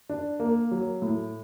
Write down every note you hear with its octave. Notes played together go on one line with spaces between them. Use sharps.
D4
A#3
F#3
A2